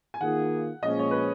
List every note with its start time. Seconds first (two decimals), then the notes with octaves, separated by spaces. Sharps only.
0.14 G#5
0.21 D#3 A#3 F4 G#4 F#5
0.83 A#2 F3 G#3 C#4 D#5
0.99 C#5
1.11 B4